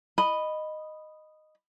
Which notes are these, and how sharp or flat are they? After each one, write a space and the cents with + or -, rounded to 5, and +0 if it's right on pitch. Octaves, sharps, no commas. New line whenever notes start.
D#5 -10 B5 +0